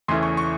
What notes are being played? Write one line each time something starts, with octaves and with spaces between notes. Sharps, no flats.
E2 C#3 E3 A3 C6
C#6
C#6